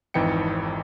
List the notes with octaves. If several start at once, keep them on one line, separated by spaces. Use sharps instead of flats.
G#1 F2 E3 D#4 G5 C#7